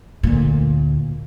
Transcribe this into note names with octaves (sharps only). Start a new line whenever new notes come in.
D2 A#2